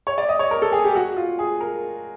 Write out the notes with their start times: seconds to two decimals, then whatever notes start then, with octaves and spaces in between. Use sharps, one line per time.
0.07 C#5
0.18 D5
0.29 D#5
0.39 C#5
0.51 A#4
0.62 A4
0.73 G#4
0.84 G4
0.95 F#4
1.17 F4
1.39 G#4
1.61 A#4